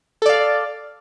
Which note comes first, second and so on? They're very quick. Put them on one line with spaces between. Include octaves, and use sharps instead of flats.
A4 D5 F5